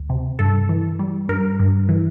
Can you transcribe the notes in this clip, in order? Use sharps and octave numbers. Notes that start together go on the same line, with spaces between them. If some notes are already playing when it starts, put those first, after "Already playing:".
Already playing: D2
C3
G2 A4
E3
G3
G2 A#4
G2
E3